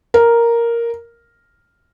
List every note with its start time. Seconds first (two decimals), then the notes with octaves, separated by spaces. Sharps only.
0.14 A#4